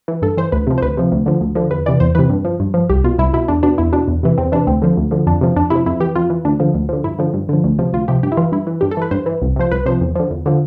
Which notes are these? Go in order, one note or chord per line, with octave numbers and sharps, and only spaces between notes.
E3
G2 A4
E3 C5
D2 B4
C3 F3
C5
D2 B4
C3 F3
D2
D3 F3
D2
D3 F3
E2 B4
C3 E3 D5
E2 C5
C3 E3 B4
G2
F3
G2
F3
C2 G4
B2 F4
C2 E4
B2 E4
E2 D4
B2 D4
E2 E4
B2 D4
E2
C3 E3
E2 C4
C3 E3 D4
D2 C4
D3 F3
D2
D3 F3
F2 D4
C3 F3
F2 D4
C3 F3 E4
F2 E4
E3 G4
F2 F4
E3
D2 D4
D3 F3
D2
D3 F3
G2 E4
D3 F3
G2
D3 F3
D2
C3 F3
D2 F4
C3 F3 G4
G2 G4
E4
E3 F4
G2 E4
E3
G2 G4
A4
E3 B4
G2 C5
E3
C2
C3 F3 C5
C2 B4
C3 F3 C5
E2
D3 F3
E2
D3 F3